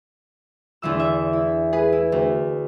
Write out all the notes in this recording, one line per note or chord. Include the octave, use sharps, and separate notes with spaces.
E2 D3 E3 E6
E5
E4
G#4 B4
E4
D2